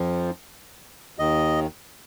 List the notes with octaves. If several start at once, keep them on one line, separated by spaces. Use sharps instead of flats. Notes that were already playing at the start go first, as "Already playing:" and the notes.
Already playing: F2 F3
D#2 D#3 D#5